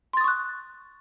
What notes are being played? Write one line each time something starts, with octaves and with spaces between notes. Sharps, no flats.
C6 C#6 D#6 F#6 A6